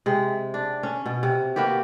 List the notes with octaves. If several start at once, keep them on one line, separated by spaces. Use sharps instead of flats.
C3 G#3
D4
C#4
B2
C3
A#3 B3 F#4 G4